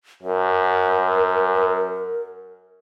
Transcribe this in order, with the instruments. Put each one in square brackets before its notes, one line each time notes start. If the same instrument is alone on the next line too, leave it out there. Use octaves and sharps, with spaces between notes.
[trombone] F#2 [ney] A#4